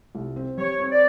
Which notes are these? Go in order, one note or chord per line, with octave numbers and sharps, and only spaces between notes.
C2
C4
G3 C#5
C4
D5